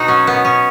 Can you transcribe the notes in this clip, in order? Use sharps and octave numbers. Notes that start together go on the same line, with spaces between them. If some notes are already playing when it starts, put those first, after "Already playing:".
Already playing: B2 D#4 F#4
F#3 C#4
B3
B2
C#4